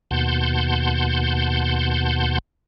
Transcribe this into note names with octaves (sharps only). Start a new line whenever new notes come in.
D#2 B2 F#5 A5 C6 G6